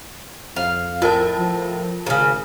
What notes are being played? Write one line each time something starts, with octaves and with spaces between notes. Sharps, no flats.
F2 F5
A2 F4 A#4 A5
F3
G#1 A#2 C#3